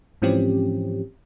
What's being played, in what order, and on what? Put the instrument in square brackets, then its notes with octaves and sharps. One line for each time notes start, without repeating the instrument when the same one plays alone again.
[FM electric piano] G#2 E3 F3 C4 C#4 G4